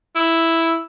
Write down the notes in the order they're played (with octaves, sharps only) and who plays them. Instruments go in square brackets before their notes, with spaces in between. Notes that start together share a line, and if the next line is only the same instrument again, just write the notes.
[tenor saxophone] E4